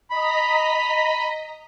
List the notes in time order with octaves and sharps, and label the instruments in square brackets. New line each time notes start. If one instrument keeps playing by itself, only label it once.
[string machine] D#5 A#5 B6 [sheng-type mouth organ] B5